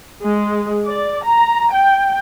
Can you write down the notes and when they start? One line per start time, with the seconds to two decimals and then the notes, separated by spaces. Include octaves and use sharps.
0.23 G#3
0.85 D5
1.23 A#5
1.72 G5